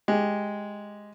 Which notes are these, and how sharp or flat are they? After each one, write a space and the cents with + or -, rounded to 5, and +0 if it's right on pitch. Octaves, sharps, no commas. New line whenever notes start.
G#3 +0 G4 +0